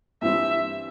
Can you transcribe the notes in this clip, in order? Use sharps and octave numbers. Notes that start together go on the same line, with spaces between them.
G2 E3 G3 C4 E5